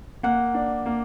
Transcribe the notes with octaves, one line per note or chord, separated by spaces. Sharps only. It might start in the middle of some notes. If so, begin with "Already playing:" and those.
A#3 F#5
D4
A#3